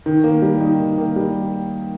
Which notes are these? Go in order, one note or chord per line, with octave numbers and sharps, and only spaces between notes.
D#3
A#3
G3
D#4
D#3
A#3
G3